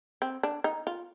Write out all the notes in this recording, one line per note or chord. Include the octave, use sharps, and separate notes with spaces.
C4
D4
D#4
F4